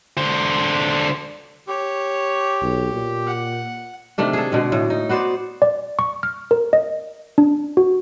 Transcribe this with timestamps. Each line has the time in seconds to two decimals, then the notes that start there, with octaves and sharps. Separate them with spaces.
0.18 D3 C5
1.68 G4 C#5
2.62 B1
2.93 A#2
3.27 F#5
4.18 C3 D#3 A3 D4
4.33 G#4 A4
4.52 B2 D3 G#3
4.72 A2
4.90 D#4
5.09 B3 F#4 C5 D5
5.62 D5
5.99 C#6
6.23 F6
6.51 A#4
6.73 D#5
7.38 D4
7.77 F#4